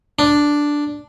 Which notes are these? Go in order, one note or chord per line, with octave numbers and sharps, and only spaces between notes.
D4